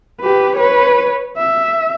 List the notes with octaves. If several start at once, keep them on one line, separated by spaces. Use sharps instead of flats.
G4 B4
B4 C#5
E5